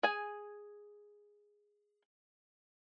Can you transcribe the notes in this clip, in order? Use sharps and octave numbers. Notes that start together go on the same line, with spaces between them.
G#4 G#5